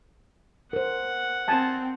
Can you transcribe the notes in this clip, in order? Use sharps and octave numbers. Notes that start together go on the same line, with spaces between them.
A#4 C5 F#5
C4 G#5 A5